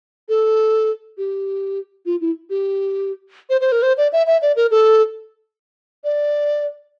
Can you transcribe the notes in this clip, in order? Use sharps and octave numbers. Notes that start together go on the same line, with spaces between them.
A4
G4
F4
E4
G4
C5
C5
A#4
C5
D5
E5
E5
D5
A#4
A4
D5